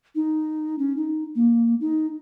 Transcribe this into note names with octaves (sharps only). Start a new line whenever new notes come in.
D#4
C#4
D#4
A#3
D#4